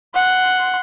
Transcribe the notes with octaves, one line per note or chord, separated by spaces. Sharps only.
F#5 C6